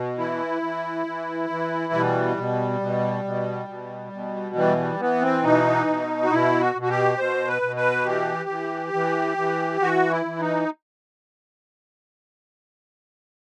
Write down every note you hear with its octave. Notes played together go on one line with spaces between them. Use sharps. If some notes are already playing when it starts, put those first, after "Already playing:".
Already playing: B2
E3 E4
E3
E3
E3
B2 G3
B2
B2
B2
B2
B2
E3 G3
G3
E3 B3
C4
B2 D#4
B2
F#4
B2 E4
F#4
B2
F#4
G4
B2 C5
B4
B2
B4
E3 G4
E3
E3
E3
E3 F#4
E4
E3
D#4